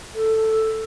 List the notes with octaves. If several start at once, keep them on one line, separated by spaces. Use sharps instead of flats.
A4